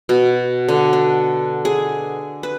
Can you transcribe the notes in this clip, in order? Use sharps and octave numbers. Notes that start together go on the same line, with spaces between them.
B2
D3
D4
G#4
B4